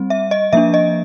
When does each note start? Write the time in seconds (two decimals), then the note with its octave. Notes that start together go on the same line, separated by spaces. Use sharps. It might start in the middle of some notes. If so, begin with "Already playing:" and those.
Already playing: G3 C4
0.10 E5
0.31 D#5
0.53 F3 A#3 D4 E5
0.74 D#5